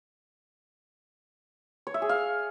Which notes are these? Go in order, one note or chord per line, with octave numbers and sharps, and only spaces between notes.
C#5
E5
G#4
F5